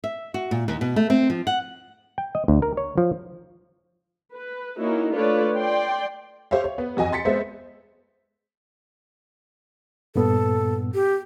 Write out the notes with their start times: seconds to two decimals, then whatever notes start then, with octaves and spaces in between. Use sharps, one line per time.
0.04 E5
0.34 F#4
0.51 A#2
0.68 D#2
0.81 B2
0.96 A3
1.10 C4
1.30 F3
1.47 F#5
2.18 G5
2.35 D#5
2.48 D2
2.62 A#4
2.77 C#5
2.98 F3
4.34 B4
4.79 A#3 C#4 D#4 E4 F#4
5.14 A3 D4 F4 B4 C#5 D5
5.57 D5 G5 C6
6.51 G4 C5 C#5 E5 F5
6.64 C#5
6.78 B3
6.97 F2 F#4 D#5 G#5
7.12 C6 A6 B6 C#7
7.25 G#3 B3 C4 C5 E5
10.16 G2 A#2 B3 A4
10.94 G4